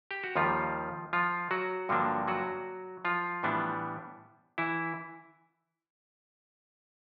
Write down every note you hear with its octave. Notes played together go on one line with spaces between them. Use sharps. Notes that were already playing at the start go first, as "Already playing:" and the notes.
G4
F#4
D#2 D#3 F3 G3 F4
F3 F4
F#3 F#4
G2 D3 F3 A#3 D4
F#3 F#4
F3 F4
A2 E3 G3 B3 D4
E3 E4